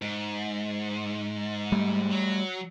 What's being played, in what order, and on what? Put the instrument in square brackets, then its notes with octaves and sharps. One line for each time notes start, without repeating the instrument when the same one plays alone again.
[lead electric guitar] G#2
[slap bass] G3 A3
[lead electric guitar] F#3